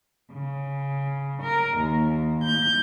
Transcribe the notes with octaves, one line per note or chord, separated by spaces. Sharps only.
C#3
A#4
D#2
G6